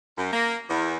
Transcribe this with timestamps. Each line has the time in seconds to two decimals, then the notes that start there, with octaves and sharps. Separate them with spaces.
0.17 F#2
0.33 A#3
0.69 E2